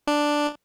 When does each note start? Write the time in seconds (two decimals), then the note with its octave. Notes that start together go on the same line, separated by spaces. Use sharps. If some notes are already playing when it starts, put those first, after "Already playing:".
0.07 D4